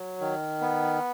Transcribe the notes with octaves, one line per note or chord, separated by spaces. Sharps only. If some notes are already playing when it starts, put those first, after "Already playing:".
Already playing: F#3
D#3
B3